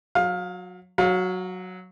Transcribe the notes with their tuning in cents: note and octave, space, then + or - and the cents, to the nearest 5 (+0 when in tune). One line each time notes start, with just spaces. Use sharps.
F#3 -20 F5 +20
F#3 +0 F5 +35